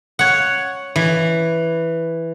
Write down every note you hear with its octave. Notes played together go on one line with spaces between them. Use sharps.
C#5 F#5
E3